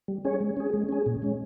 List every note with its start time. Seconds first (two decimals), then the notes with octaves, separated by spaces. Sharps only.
0.08 G3
0.25 C#4 G#4 C#5
0.41 G#3
0.57 C#4 G#4
0.74 G#3
0.89 C#4 G#4
1.06 A#2
1.22 G#3 C#4